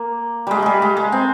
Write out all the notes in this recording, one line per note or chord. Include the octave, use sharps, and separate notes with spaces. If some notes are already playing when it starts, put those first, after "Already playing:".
Already playing: A#3
G3 G#3
G3 G#3
G#3
G#3
C4